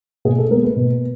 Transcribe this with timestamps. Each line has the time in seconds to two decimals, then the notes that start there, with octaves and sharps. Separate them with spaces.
0.25 B2 G#4
0.38 A4
0.51 G#3 A#4
0.55 B3
0.64 B4
0.76 B2